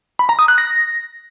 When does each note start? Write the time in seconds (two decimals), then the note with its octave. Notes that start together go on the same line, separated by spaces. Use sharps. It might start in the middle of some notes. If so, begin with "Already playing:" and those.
0.19 B5
0.29 A#5
0.39 D#6
0.48 F#6
0.58 A#6